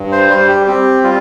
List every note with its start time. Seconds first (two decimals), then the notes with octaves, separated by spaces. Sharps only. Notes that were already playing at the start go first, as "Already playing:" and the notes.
Already playing: G2
0.12 C5
0.29 G3 C5
0.48 G4
0.66 C4 G4
1.04 G3 F4